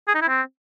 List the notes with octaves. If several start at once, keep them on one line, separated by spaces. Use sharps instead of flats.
G#4
D#4
E4
C4